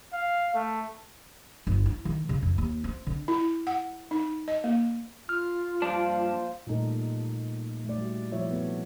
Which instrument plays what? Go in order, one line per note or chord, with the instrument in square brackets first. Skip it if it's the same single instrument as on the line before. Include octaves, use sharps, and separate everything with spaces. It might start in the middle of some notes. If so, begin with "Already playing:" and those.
[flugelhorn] F5
A3
[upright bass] G1
E4
D#3
C#3
F2
D#2
C4
D3
[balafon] E4
F#5
D#4
D#5
A#3
[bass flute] F4 [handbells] F6
[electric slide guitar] G2 D5 A5 [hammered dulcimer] F3 A#3
[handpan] A#2 G3 A3 D#4 A4 A#4
A3 D5
G3 F#4
C3 F3 E4 C#5 E5
B3 A4